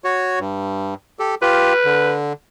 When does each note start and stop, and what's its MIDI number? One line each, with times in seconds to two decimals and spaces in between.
0.04 0.39 66
0.04 0.39 73
0.39 0.94 43
1.19 1.35 67
1.19 1.35 69
1.42 1.73 65
1.42 1.73 67
1.42 2.15 71
1.85 2.33 50